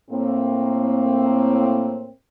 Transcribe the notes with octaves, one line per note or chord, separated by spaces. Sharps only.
A2 A#3 C4